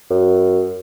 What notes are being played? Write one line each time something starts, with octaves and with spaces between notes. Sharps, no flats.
F#2